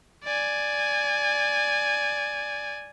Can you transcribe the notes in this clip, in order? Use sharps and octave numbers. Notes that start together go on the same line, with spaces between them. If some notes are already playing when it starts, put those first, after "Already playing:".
D5 G#5